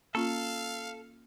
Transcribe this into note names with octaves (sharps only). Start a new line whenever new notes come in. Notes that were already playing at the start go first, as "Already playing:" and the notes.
A#3 C#4 F4 A4 F5